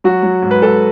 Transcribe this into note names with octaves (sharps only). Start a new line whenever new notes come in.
F#3 F#4
F#3
G#2
B4
G#2 A4